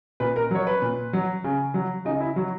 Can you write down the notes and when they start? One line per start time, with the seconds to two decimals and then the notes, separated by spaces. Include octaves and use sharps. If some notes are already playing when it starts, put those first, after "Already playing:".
0.20 A#2 B4
0.36 A#4
0.51 F#3 C#5
0.67 B4
0.82 A#2
1.13 F#3
1.44 C#3
1.74 F#3
2.05 C#3 D#4
2.21 E4
2.36 F#3 F#4